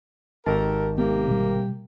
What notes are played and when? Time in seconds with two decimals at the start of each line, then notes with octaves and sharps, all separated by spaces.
0.46 G#1 D#3 G4 A4 A#4 A5
0.98 C3 G#3 A#3 B3 G4
1.28 B2 G3